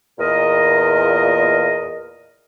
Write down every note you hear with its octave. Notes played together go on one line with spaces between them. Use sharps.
E2 A#2 A#4 D#5